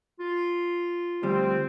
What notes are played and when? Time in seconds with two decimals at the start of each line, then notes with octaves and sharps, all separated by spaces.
0.20 F4
1.23 D2 F3 G3 C4